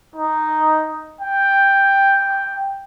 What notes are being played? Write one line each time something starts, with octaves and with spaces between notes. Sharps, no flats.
D#4
G5